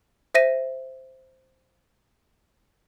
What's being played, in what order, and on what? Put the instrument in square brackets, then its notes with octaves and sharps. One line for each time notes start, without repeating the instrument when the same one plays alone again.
[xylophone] C5 E5 A#6 D#7